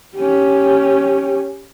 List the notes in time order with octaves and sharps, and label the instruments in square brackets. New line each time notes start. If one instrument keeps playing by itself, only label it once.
[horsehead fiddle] C#4 G4